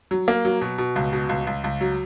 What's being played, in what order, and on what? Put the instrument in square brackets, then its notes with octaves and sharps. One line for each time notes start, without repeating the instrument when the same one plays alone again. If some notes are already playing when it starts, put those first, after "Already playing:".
[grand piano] F#3
A#3
F#3
B2
B2
C#2
B2
C#2
C#2
C#2
F#3